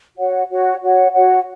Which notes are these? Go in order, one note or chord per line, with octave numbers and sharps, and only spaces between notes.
F#4 C#5 F#5
F#4 C#5 F#5
F#4 C#5 F#5
F#4 C#5 F#5